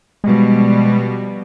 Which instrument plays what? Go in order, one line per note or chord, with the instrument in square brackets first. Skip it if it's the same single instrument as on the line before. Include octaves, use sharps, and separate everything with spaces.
[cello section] B2 F3 G3 [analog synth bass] G#3